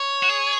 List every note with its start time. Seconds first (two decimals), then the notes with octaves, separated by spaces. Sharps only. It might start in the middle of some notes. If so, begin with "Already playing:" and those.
Already playing: C#5
0.23 F#4
0.28 G#4